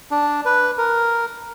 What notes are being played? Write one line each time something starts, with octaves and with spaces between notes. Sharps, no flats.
D4
B4
A#4